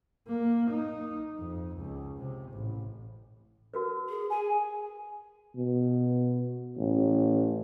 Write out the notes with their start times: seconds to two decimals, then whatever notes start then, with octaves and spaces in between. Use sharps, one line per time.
0.27 A#3
0.70 D#4
1.39 F2
1.77 C#2
2.18 C3
2.52 A1
3.74 F#4 A#4 B4
4.09 G#4
4.30 G#4 G#5
5.56 B2
6.77 A1